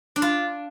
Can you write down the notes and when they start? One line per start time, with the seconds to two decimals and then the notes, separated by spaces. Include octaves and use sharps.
0.16 D4
0.22 F4